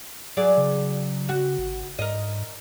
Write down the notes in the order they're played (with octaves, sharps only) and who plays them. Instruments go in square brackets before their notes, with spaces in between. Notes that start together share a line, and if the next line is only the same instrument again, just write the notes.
[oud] F#3 G#4 D5
[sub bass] C#3
[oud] F#4
[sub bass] G#1
[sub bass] G#2 [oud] A#4 D#5